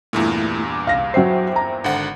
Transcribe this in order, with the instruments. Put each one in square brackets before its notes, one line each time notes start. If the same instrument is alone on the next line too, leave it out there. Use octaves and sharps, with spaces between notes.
[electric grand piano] E2 G2 A#2 [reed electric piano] A3 E4
[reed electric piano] D6
[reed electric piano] C2 [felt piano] F5 A#6
[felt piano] F#3 C7 [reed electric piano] C5 E5 G5
[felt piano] A#5
[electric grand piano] G#1 D3 F#5